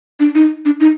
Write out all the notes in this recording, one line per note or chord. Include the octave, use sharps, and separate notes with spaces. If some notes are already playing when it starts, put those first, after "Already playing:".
D4
D#4
D4
D#4